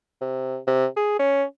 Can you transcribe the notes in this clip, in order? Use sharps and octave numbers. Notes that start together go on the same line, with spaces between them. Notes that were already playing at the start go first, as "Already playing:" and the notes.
C3
C3
G#4
C#4